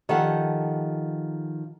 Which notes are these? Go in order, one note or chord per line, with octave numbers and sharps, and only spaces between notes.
D#3 F3 G4 A4 F#5